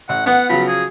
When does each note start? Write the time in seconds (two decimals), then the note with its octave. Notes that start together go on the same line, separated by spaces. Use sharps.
0.09 A1 F#5
0.26 B3 F#5
0.49 C#3 F3 F#3 B5
0.68 G#4